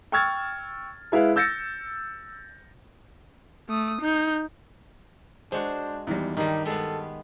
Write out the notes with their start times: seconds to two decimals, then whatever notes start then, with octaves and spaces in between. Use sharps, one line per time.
0.12 G5 C#6 E6 F6 G#6 A6
1.12 G#3 E4 B4 F5
1.36 E6 G6 A6 A#6 C#7
3.69 A3 D#6
4.01 D#4 G6
5.52 G#3 D4 F#4 C5
6.07 E2 D#3 G3
6.37 G2 D#3 G3 D#4
6.66 G#3 B3 A4